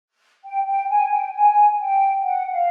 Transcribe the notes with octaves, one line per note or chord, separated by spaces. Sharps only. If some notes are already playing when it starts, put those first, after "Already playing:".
G5
G5
G#5
G5
G#5
G5
F#5
F5